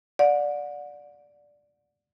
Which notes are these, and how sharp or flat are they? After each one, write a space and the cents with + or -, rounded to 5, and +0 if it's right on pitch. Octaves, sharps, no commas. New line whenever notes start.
D5 +0 F#5 -35